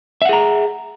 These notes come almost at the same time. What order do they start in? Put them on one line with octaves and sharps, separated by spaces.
E5 F#5 G#4 A#5